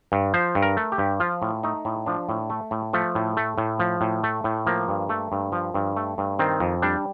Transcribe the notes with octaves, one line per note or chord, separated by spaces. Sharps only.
G2
F3 C5
G2
A#4
A3
G4
G2
F3 F4
A2
A3 D#4
A2
F3 D4
A2
A3
A2
F3 A3
A2
A3
A2
F3
A2
A3
A2
F3 A#3
G2
A3
G2
F3
G2
A3
G2
D#3 C4
F2
G3 D4